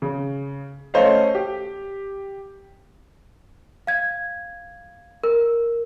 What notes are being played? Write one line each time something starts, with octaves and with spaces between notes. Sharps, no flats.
C#3
A3 C#4 C5 D#5 F5
G4
F5 G#6
A#4